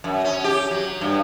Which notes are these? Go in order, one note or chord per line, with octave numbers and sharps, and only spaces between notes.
F#2
C#4
G4
F#3
G2